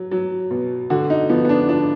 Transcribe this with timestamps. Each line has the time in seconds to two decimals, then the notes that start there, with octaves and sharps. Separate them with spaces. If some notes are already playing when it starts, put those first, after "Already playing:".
Already playing: F#3
0.11 F#3
0.51 B2
0.90 D3 F#4
1.10 D#4
1.29 F3 B3
1.44 B3
1.49 D4
1.69 F3 D4